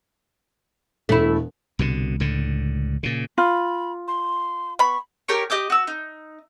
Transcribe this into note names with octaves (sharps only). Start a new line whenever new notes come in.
E1 A3 E4
C2 B2 D3
C#2 A2 D3
A#2 C#3
F4 B5
C6
B3 B5 C#6
G4 A#4 C#5 C#6
G4 D#5 D6 G6
F#4 E6
D#4